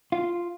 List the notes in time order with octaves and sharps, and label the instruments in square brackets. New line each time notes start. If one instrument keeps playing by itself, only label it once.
[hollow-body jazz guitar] F4